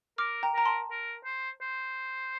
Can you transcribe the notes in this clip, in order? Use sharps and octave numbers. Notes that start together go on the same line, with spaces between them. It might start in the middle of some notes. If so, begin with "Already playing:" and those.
A#4 D6 F6
G5 A#5
A#4 A#5
A5 C6
A#4
C5
C5